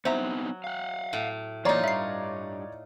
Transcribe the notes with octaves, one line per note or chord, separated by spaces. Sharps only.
F#3 B3 C4 D#4 C5 E5 A#5
F5 F#5
A2
E3 F#3 A#3 D#4 F4 C#5 D5 A#5
G2 E5 C7